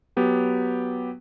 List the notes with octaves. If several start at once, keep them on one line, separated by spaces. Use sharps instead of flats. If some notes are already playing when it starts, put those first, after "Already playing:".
F#3 B3 G4